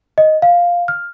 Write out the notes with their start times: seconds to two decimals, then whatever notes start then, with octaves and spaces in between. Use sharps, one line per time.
0.18 D#5
0.42 F5
0.88 F6